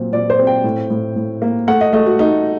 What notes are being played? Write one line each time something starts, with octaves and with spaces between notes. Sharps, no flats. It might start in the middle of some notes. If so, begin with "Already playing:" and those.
Already playing: A#2 F#3 C4
A#2 D5
C5
C4
G5
A2
A2
A2
A#3
A3 F#5
D#5
A3 D#5
F#4
A3 D#4